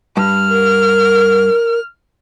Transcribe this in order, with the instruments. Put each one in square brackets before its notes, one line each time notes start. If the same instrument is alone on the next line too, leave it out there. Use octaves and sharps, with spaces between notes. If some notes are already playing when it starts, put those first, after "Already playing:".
[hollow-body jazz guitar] G2 [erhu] F6
[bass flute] A#4